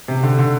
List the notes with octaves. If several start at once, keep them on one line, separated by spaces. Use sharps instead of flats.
C3
D3
D3